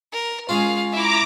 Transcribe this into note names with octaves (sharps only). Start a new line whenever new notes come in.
A#4
G#3 C#4 F4 G#4 F5
E4 E5 A#5 D6